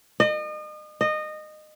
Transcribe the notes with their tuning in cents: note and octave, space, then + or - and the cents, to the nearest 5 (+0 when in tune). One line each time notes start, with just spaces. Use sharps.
D#5 -35
D#5 -20